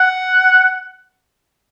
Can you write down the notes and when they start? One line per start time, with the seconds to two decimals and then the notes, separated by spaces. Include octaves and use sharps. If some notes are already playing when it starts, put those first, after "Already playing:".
Already playing: F#5